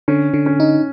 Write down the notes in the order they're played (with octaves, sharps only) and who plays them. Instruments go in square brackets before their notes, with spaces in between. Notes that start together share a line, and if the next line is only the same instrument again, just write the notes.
[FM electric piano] D3 [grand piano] C#4
[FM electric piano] D3
[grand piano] C#4
[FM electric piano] D#4